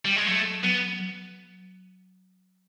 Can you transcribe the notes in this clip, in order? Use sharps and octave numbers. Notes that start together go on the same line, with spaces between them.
G3
G#3
F#3 A3
F#3 B3
F#3